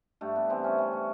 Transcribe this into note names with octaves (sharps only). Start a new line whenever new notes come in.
G2 A3
B3
E3 C4
C#4
E3
C#4